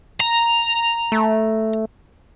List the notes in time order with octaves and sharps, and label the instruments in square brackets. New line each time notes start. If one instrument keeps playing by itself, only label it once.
[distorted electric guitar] A#5
[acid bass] A3